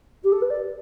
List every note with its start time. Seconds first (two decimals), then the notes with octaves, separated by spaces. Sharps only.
0.23 G4
0.32 A4
0.41 B4
0.49 D5